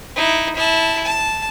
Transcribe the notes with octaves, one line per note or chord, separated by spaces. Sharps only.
D#4 E4
E4 A5
A5